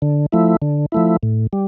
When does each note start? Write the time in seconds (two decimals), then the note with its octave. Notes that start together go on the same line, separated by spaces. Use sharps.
0.02 D3
0.32 F3 A3 E4
0.62 D3
0.92 F3 A3 E4
1.23 A2
1.53 G3